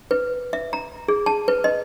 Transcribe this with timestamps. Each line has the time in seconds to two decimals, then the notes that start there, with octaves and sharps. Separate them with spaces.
0.11 B4
0.53 E5
0.73 A#5
1.08 G#4
1.26 A5
1.48 B4
1.64 D#5